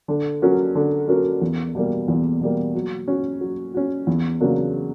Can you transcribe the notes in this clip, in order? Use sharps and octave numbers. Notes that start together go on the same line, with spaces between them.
D3
F#3 C#4 F#4 A#4
D3
F#3 C#4 F#4 A#4
E2
B2 G3 A#3
E2
B2 G3 A#3
F#3
C#4 F#4
F#3
C#4 F#4
E2
C#3 F#3 A#3 D4